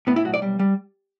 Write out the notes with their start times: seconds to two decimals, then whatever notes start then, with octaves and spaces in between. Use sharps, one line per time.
0.07 A2 B3
0.16 E4
0.25 B1 F#4
0.34 D5
0.42 G3
0.59 G3